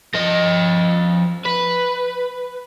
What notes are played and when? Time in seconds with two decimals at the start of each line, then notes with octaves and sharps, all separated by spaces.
0.14 F3 D#5
1.46 B4